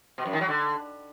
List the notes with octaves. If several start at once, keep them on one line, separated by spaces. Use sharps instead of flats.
B2
F#2
D#3
F#3
D3